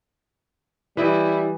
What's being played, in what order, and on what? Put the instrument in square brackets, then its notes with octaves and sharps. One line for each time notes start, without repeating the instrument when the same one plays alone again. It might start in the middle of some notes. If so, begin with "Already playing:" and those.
[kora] E3 D#5 [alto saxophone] G3 [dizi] E4